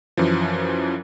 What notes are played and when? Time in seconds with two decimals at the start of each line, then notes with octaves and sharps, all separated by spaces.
0.17 F#2 E3 F3